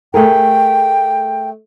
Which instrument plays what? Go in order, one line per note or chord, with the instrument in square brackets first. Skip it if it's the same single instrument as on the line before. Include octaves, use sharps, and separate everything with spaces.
[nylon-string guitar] A3 G#4 A#4 [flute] G5